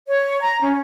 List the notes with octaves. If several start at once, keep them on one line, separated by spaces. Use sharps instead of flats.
C#5
A#5
C#4